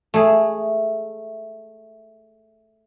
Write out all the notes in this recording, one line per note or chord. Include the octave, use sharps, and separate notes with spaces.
A3 G#4